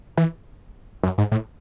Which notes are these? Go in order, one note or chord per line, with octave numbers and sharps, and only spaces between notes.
E3
F#2
G#2
A2